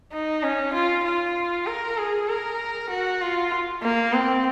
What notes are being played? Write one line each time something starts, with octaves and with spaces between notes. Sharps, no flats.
D#4
C#4
F4
F4
A#4
G#4
A#4
F#4
F4
A#3
C4